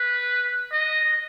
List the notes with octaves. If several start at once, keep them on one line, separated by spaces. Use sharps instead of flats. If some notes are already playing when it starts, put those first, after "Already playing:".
Already playing: B4
D#5